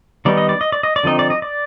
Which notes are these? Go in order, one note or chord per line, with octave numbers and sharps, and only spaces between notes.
D#3 G3 B3 D#4 D5
D#5
D5
D#5
D5
D#5
D5
D3 F3 C4 D#4 D#5
D5
D#5
D5